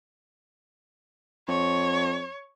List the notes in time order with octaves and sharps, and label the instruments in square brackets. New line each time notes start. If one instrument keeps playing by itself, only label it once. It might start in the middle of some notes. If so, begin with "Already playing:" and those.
[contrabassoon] F2 [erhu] C#5